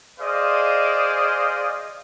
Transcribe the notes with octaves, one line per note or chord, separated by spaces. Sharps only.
G#4 C5 D5 D#5 F5